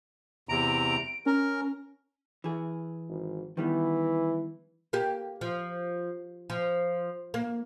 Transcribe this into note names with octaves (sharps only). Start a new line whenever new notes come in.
E2 C3 A#5 D7
C#4 A#4
E3 G#4
G#1
D#3 E3 G3 B3
A#3 G4
F3
F3
A#3